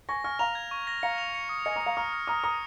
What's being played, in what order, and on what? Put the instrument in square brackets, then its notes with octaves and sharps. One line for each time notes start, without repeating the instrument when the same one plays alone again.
[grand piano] G#5 C#6 [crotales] A#6
[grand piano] G#5 C#6 [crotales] F6
[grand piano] F5 A#5 [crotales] F7
[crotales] G#6
C#6
A#6
[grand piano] F5 A#5 [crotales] C#7
[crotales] F7
C#7
D#6
[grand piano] D#5 G#5 [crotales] C#7
[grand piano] A#5 D#6 [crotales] C#7
[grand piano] F5 A#5
[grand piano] A#5 D#6 [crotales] F6
[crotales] F6
[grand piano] A#5 D#6 [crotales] F6
[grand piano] A#5 D#6 [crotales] C#7